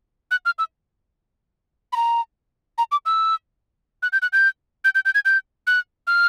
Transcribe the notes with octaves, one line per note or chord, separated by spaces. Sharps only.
F#6
F6
E6
B5
A#5
A#5
D6
E6
F#6
G6
F#6
G6
G6
G6
G6
G#6
G6
F#6
F6